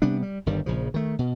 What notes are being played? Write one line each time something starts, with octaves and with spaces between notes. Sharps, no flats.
C3 G3 B3 D4
G3
G1 G2 D#3 G3
A#1 C#3 F3
D#3 A3
B2